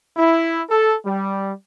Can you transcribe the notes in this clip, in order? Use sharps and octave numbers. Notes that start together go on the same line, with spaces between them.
E4
A4
G3